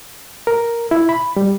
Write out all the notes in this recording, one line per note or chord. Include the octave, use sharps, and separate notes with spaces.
A#4
E4
B5
G3